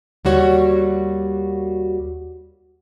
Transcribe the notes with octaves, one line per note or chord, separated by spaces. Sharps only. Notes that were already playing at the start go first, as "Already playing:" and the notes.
D#2 G3 F#4 C#5